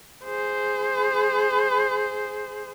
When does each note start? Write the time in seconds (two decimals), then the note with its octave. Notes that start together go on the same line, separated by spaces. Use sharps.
0.25 G#4 C5